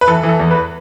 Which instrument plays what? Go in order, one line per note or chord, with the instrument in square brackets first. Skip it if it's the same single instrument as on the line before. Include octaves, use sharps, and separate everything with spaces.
[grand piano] B4
E3 A4
E3
A4
E2
B4